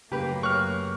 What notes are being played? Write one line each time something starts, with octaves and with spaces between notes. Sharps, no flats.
F#2 C#3 A3 A#3 C#4 G4 B4
C#5 C#6 F6 F#6